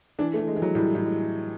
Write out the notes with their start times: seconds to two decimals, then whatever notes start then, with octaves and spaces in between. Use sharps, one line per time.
0.19 E3 D4
0.34 A3
0.38 E3
0.47 G#3
0.56 E3
0.62 F#3
0.75 A2 G3
0.95 A2
1.04 G#3